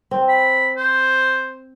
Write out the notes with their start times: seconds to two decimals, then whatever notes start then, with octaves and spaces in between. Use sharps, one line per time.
0.11 C4
0.29 B5
0.77 C5